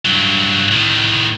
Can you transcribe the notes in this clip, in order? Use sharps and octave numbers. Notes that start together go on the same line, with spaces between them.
G2 F#3
A2 D#3